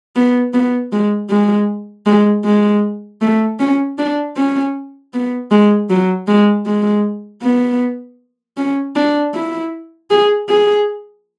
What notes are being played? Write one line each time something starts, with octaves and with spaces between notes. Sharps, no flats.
B3
B3
G#3
G#3
G#3
G#3
A3
C#4
D4
C#4
B3
G#3
F#3
G#3
G#3
B3
C#4
D4
E4
G#4
G#4